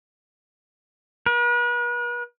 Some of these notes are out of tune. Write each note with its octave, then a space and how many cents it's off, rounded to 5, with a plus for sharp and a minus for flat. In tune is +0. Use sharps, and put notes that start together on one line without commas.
B4 -40